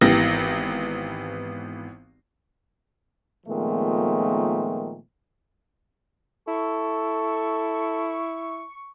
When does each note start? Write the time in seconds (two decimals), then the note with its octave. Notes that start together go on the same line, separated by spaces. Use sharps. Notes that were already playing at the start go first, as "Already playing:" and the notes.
0.01 G#1 E3 B3 G4 A#6
3.47 A#2 D#3 F3 G#3 A3 B3
6.48 E4 A4 C#6